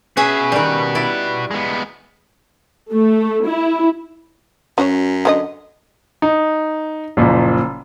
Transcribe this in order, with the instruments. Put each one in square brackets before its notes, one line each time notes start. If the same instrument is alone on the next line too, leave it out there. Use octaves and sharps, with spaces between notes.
[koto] C#4 G#4 E5 [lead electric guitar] F#4 B4
[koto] D#3 G3
E4 D5
[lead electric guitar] G#3 B3
[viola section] A3
E4
[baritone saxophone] F#2 [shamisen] C#4 F#4 C#5
[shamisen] D3 C#4 D#5
[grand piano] D#4
F#1 A#2 F3